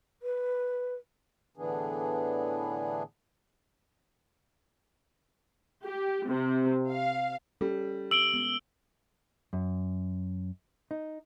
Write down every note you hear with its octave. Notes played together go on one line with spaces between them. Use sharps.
B4
A2 D3 E3 B3 D4 G#4
G4
C3
F5
G3 C#4 A4
E6 D7 F#7 G7
G#3 B3
F#2
D#4